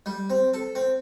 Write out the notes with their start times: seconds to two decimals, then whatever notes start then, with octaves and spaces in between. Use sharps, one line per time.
0.06 G3
0.30 C4
0.54 A4
0.75 C4